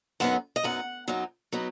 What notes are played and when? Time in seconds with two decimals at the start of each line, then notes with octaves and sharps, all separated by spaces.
0.20 F#2 F#3 B3 D#4 F#5
0.56 D#5
0.63 F#2 F#3 B3 D#4 F#5
1.08 F#2 F#3 B3 D#4
1.52 F#3 B3 D#4